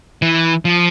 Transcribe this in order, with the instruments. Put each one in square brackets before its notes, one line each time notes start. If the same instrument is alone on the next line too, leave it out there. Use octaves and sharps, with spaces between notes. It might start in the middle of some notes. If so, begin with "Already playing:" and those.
[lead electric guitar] E3
F3